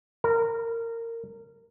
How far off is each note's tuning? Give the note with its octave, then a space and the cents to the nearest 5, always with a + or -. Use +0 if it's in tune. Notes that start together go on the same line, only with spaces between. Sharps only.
A#4 -20